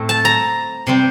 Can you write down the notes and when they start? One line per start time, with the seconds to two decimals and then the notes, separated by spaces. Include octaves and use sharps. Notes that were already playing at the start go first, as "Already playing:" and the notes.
Already playing: A2 A3 C4
0.09 A5
0.25 A#5
0.87 C3 G3 C4